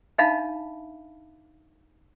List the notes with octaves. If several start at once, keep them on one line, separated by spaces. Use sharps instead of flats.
D4 D#4 E5 F5 A5 B5